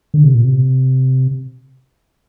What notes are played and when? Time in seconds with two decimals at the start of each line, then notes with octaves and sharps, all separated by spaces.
0.14 D3
0.24 C3
0.35 A#2
0.44 C3